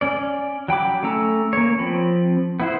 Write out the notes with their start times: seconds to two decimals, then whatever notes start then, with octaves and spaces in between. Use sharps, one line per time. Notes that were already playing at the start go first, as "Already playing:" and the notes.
0.01 C#4 D5
0.68 F#3 G5 B5 D6
1.03 A3 C#4 A#5 E6
1.53 A#3 C#5
1.79 F3 C4 B5
2.60 B3 E4 C5